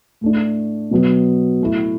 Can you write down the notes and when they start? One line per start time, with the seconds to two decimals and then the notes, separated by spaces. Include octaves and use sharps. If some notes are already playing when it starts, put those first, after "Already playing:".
0.21 A2 A3 D4
0.91 B2 F#3 B3
1.61 A2 A3 E4